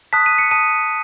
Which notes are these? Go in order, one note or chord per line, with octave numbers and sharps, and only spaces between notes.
A5 D#6 F#6 B6
D#7
C#7
A5 D#6 F#6 D#7